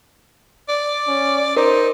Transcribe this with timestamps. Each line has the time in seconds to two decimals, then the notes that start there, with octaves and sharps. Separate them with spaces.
0.69 D5
1.08 C#4
1.57 D#4 A#4 C5